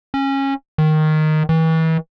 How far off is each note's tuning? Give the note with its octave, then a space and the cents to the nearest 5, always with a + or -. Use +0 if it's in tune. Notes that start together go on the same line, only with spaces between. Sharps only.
C#4 -20
D#3 -5
E3 -35